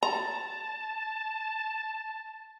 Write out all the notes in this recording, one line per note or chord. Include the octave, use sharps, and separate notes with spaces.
A5 A#5